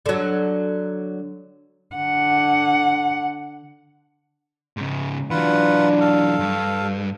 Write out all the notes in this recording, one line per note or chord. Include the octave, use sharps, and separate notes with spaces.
D3 F#3
D3 F#5
G#2 C#3
E3 F#3 D4 F4 B4 F#5
A4 F5
G2